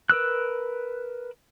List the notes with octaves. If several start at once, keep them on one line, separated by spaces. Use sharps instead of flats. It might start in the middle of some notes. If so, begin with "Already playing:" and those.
A#4 B4 E6 F#6